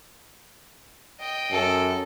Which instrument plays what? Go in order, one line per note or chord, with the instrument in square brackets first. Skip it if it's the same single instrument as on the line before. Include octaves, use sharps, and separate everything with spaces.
[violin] D#5 G5
[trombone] F#2 [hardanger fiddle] A4